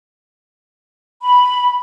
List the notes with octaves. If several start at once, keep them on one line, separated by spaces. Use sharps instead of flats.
B5